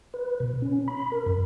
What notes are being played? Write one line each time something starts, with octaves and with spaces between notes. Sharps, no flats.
B4
B2
C#4
B5
A#4
F#2